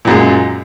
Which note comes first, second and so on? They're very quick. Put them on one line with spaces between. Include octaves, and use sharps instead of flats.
A#2 F#2 G#3